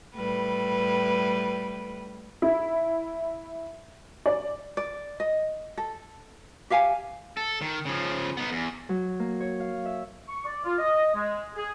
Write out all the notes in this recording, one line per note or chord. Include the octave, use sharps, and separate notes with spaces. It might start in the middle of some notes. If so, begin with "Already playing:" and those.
A2 G3 B4
E4
D5
D5
D#5
A4
G4 E5 F5 G#5
A4
D#3
C#3 F3
B3 D#4
E2
F#3
A#3
C#5
F5
E5
C#6
D5
F4
D#5
G#3
G#4